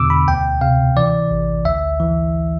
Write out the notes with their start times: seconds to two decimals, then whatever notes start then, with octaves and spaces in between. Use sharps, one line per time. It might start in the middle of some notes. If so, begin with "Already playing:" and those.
Already playing: E2 B2 D3 D6 E6
0.10 B5
0.28 D2 G5
0.61 C3 F5
0.97 E3 D5
1.31 A1
1.65 D2 E5
2.00 E3